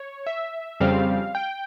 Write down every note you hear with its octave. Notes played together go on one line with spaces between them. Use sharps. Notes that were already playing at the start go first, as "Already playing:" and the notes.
Already playing: C#5
E5
F2 C#3 G3 C4 F5
G5